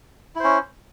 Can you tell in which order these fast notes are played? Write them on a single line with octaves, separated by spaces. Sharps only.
E4 C5 C#4